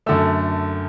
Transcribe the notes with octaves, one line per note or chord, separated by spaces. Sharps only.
F#2 D3 A3 E6